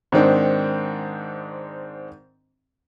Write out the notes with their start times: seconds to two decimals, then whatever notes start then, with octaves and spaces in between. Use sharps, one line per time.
0.12 G#2 D#3 C4 D4